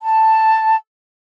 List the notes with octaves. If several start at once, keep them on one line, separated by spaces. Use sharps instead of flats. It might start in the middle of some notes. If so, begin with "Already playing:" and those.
A5